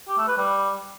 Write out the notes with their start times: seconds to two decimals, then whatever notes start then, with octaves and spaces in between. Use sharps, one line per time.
0.08 G4
0.18 A3
0.28 B4
0.37 G3